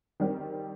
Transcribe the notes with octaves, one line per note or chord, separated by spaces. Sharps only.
D#3 G3 C4 G4